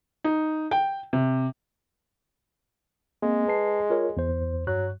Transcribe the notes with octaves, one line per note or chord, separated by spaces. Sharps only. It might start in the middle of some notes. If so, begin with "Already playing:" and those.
D#4
G5
C3
G#3 A#3 C4 G#4
B4 A5 C7
F4 A#4 C#5
E2 C5
G2 F#3 C#6 F#6